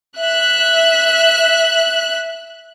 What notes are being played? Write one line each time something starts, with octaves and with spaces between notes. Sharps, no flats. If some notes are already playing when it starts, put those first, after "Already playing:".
E5 F#6